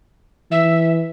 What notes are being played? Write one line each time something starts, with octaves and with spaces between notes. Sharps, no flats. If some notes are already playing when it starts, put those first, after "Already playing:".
E3 E5